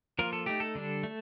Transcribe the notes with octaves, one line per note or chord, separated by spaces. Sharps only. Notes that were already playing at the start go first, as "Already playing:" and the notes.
F3 A#3 F4 A#4
A4
A3 D#4 G4
A4
D3 G3 D4
A3